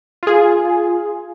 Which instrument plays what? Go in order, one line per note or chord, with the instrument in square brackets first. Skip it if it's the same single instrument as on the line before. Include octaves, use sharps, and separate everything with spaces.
[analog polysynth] F4 G#4